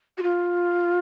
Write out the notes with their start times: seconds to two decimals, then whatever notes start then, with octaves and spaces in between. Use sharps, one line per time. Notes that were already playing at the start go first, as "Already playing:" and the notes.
0.18 F#4
0.22 F4